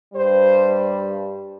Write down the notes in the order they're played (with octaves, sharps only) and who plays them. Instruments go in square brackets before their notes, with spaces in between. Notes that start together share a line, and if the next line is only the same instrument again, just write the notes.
[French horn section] G2 G3 C5